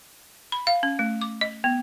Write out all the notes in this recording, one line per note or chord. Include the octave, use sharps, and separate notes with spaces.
B5
F5
C#4
A3
D6
D#5
B3